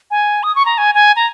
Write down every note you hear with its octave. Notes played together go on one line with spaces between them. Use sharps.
G#5
D#6
C#6
A#5
G#5
G#5
A#5